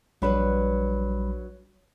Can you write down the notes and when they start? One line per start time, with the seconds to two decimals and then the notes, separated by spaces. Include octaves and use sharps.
0.22 A#1 F#3 G3 D4 B4 B5